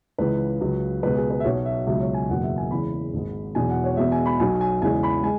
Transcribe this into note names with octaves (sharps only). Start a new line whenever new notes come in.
C#2 C#3 E3 G#3 B4
C#2 C#3 F#3
C#2 B2 G#3 B4
G#4
B4
E5
B1 B2 F#3 C#5
E5
C#2 B2 F#3 E5
C#5
G#5
F#1 E2 B2 F#3 F#5
E5
G#5
E2 C#3 E3 G#3 B5
G#1 G#2 G#3
E1 E2 B2 F#3 G#5
F#5
C#5
E2 B2 G#3 E5
G#5
B5
B1 B2 F#3 G#5
G#5
E2 C#3 E3 G#3 G#5
B5
G#3 G#5